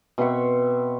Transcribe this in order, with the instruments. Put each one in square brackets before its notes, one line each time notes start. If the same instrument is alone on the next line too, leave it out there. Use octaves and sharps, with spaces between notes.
[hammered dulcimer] B2 C4 E5 C#6